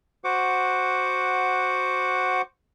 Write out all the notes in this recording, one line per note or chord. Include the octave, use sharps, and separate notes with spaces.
F#4 C5 F#5 D6